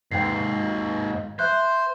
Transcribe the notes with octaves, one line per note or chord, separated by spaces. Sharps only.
D#2 G#2 G5 C7
C5 E5 F#6 G6